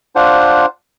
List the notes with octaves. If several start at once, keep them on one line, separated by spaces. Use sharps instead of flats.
D4 F4 C5 F#5